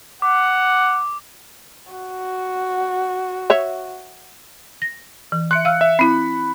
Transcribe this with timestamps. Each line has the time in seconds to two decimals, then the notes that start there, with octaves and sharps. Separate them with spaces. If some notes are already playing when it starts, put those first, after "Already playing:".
0.22 F#5 D6
1.92 F#4
3.50 C#5 E5
4.82 A#6
5.32 E3
5.51 E5 C6 F#6 C#7
5.65 F5 E6 F6
5.81 E5
5.99 C4 E4 B5